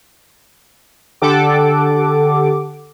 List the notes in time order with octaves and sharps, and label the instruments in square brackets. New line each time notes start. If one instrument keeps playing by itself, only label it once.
[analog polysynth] D3 G4 A4 F#5 D6